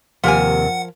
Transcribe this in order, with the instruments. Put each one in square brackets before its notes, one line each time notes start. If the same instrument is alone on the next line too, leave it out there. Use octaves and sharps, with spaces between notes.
[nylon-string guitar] D#2 C3 [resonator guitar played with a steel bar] F3 A#4 G#5 [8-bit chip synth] F#5